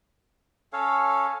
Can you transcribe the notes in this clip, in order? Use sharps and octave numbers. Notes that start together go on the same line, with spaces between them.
C#4 A4 C#5 F5